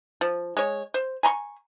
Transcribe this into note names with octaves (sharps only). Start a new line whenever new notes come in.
F3
G#3 C#5
C5
G#5 A#5 C6 C#6